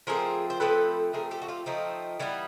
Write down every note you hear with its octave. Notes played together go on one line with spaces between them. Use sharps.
F3 A3 C4 G#4 A#4
C5
F3 A3 C4 A4 B4
F3 A3 C4 G#4 A#4
G4 A4
F#4
F4 G4
F3 A3 C4 D#4
E3 G3 B3